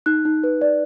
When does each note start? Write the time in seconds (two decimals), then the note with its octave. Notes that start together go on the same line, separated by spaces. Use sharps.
0.06 D#4 F#6
0.25 D#4
0.44 B4
0.61 D5